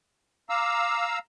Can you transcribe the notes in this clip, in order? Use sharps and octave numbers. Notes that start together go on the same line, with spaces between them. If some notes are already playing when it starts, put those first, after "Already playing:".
F5 A#5 D6 E6